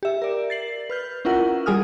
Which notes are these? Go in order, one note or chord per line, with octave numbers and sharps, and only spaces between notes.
G4 E5
A#4 D5
A6 C7 F#7
B4 F6 G6
C#4 E4 F4 A#4 F#5
G3 G#4 G#5 D#6 F6